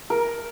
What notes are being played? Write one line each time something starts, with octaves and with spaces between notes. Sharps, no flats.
A#4